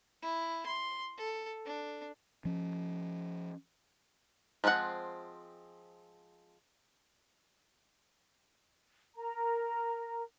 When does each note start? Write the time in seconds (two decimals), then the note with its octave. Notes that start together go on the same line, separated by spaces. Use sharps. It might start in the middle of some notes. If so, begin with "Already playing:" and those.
0.22 E4
0.66 C6
1.17 A4
1.66 D4
2.45 F3 C#4
4.64 F3 G#3 C4 D#4 F#5
9.16 A#4 A#5